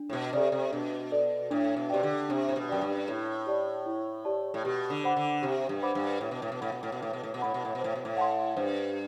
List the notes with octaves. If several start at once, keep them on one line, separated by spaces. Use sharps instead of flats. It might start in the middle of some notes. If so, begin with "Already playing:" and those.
Already playing: D4
A2
B2
C3 A4 D5
C3
B2 D4
A4 D5
A2 D4
B2
C3 G4 D5 G5
D3
C3 D4
A2
B2
F#2 G4 D5 G5
G2
A2 E4
G4 D5 A5
E4
G4 D5 A5
A2
B2 G4
D3
C5 F#5 B5 D6
D3
C3 G4
G2
C5 F#5 B5 D6
G2
A2 B4
B2
A2
B2
A2 F#5 B5
B2
A2
B2
A2 B4
B2
A2
B2
A2 F#5 B5
B2
A2
B2 C5
A2
B2
A2
F#5 A5 C6
G2 C5